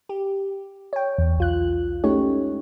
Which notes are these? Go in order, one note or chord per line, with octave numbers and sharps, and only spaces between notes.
G4
C#5 G5
E2
B1 F4 F#6
G#3 A3 C#4 D#4 G4 C#5